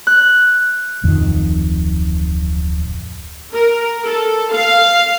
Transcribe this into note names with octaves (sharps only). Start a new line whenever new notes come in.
F#6
D1 F2 D#3
A#4
A4
F5